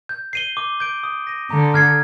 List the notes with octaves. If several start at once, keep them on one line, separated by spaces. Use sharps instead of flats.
G6
C7 D#7 G7
D6
G6 D7
D#6
A#6 D#7
D3 A#5
F6 G#6 C7